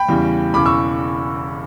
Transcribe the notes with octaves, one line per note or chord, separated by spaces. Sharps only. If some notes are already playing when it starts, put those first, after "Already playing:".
Already playing: G5 B5
E2 C#3 E3 G3
E1 E2 C#3 E3 B5 D6
C#6 E6